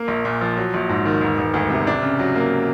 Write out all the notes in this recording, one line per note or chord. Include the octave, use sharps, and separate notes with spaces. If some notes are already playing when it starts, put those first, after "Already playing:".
Already playing: A#3
A#1
A#2
F3
F#3
A#1
G#2
D#3
E1
E1
D2
C3
D4
C#3
F#3
A#3